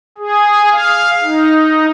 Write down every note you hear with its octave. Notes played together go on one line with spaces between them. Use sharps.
G#4
F5
D#4